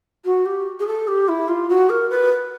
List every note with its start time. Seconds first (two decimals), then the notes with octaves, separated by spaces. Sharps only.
0.25 F#4
0.45 G4
0.79 G#4
0.87 A4
1.07 G4
1.28 E4
1.48 F4
1.69 F#4
1.89 A#4
2.10 B4